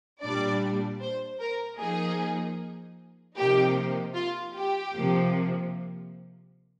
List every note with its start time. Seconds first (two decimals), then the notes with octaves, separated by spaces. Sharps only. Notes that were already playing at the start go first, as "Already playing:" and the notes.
0.22 A#2 G3 D4 D5
1.01 C5
1.40 A#4
1.79 F3 A#3 D#4 G#4
3.37 C3 F3 A#3 D#4 G4
4.15 F4
4.55 G4
4.94 C3 F3 A#3